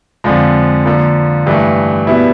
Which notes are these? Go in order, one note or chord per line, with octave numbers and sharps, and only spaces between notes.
F2 D3 F3 G#3
D3 F3 A#3
G2 E3 A3
B2 G3 B3 E4